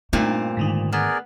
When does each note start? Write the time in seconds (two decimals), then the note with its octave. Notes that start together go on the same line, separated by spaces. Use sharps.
0.13 G2 A#2 A3 C4 D#4
0.57 G#2 D3 D#3
0.92 B3 G#4 A#4 D5